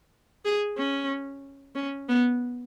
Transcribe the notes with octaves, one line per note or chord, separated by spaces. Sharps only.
G#4
C#4
C#4
B3